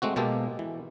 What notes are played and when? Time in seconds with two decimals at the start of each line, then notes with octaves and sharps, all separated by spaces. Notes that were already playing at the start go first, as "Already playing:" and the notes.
0.02 G#3 A3 C4 F#4
0.16 B2 G#3 A#3 G4 A4
0.59 E3